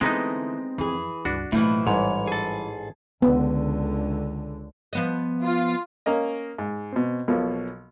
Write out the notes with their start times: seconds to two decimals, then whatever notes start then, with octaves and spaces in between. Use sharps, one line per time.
0.01 D3 E3 G#3 A3 B3 C4 D#4 A#5
0.78 F2 E3 G#4
1.25 C#2 G2 D4 F#4
1.52 B1 A2 E3 F3 A3 A#3 E4
1.87 A1 G#2 G3 C#5
2.27 G#4 A5
3.22 C#2 D3 B3
4.93 F3 B3 D#5
5.44 F4
6.06 A#3 C#4 A#4 D#5
6.58 G#2
6.93 B2 C4
7.28 B1 B2 F3 A#3